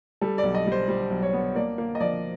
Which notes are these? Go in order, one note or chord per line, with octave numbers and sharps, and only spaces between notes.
G3 A4
D5
B1
D#5
G3
C5
G3 C5
B1
C#5
B3
A#3 D5
A#3
D#5
F3 D5